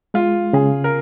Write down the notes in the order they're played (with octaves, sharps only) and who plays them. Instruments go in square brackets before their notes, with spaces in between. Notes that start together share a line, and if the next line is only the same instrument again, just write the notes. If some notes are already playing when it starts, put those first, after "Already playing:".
[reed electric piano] G#3 [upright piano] F4
[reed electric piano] C#3 [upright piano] G#4
[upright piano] A#4